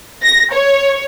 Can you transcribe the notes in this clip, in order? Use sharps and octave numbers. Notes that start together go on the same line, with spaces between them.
A#6
C#5